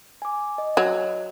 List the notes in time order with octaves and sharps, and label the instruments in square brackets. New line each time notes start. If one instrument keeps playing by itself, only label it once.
[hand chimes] G#5 D6
D#5
[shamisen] F#3